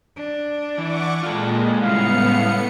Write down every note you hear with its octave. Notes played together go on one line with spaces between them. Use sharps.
D4
E3 F#5 C#6 D6
A#2 G#3 F4 A4
A2 C#3 G3 G#3 B3 E4 F5 C#7